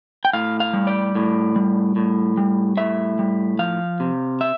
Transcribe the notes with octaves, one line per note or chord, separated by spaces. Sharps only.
G5
A2 F5
F5
G3
D5
A2
G3
A2
G3
A2 E5
G3
F3 F5
C3
E5